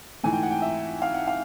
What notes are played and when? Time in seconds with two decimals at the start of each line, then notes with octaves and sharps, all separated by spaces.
0.23 G#2 E3 A3 G#5
0.33 G5
0.43 F#5
0.51 G5
0.62 E5
1.02 F5
1.14 F#5
1.27 F5